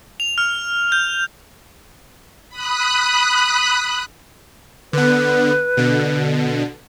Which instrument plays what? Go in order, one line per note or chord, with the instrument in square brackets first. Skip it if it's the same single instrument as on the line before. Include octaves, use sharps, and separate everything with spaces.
[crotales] F7
F6
G6
[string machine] B5 D#6 F#6
[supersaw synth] D3 B3 [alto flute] B4
[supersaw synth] B2 D3